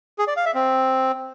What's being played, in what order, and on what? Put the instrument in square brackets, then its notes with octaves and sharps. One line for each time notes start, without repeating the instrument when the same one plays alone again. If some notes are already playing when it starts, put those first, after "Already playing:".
[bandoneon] G#4
D5
F5
E5
C4